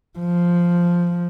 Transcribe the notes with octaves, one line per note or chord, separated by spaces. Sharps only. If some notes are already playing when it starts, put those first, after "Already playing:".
F3